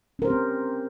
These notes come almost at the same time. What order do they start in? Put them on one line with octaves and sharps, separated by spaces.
C#4 A#4 C5 G4 C4